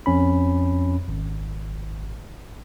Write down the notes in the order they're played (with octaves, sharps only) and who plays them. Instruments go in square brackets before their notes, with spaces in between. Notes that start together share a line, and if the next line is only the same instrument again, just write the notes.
[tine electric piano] F2 C#4 B5
G#1